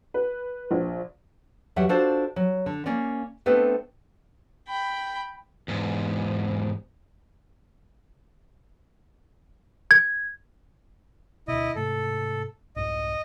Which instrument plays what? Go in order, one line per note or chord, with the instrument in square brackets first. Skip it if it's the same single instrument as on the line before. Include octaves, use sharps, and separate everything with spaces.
[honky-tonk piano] B4
A#1
[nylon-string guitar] E2 F#3 G3 E5 F#5
D4 F4 F#4 A4 C5 D5
F#3
D3
A#3 C#4 D5
A3 B3 C4 D4 A4 B4
[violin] G5 B5
[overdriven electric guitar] E2 G#2
[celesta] G#6
[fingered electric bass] D2 B2 [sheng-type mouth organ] E4 D#5
[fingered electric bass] G#2 C3 A3 [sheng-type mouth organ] A4
[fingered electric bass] C2 F2 G#2 [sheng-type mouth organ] D#5